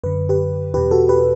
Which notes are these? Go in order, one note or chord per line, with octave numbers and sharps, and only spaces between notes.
F#2 D3 B4
G4 B4
E2 B2 G4 B4
F#4 A4
G4 B4